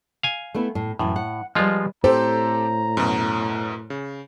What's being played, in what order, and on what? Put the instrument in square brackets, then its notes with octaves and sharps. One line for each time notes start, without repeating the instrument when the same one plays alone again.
[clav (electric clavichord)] F5 G#5
[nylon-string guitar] A3 B3 E4
A2
[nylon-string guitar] F#2 E3 [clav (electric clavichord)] A2
[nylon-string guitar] F#5
[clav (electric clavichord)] F3 G#3 F4 [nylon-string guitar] G3 B4 D#5
[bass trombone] A2 [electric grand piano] C4 G4 A4 [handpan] C5 [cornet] A#5
[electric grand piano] F#2 B2
C#3